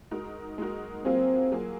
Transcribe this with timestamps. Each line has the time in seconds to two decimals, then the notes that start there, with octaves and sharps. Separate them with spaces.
0.11 G#3 D#4 F#4 A#4
0.58 G#3 D#4 F#4 A#4
1.05 F#3 A#3 C4 F4 G#4
1.52 F#3 A#3 F4 G#4